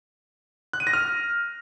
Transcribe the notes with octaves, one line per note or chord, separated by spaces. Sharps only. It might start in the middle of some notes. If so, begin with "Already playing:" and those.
F#6
D#7
A#6
F6